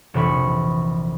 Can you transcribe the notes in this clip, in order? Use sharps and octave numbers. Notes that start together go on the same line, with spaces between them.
F1 A#1 E3 B5 C#6